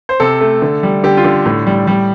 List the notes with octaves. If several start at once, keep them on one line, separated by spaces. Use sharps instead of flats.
C5
C3 A4
A3
D3
G3
D3 G4
F4
D3
A2
G3
G3